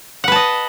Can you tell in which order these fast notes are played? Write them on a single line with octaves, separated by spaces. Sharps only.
F#5 B4 A5 D#5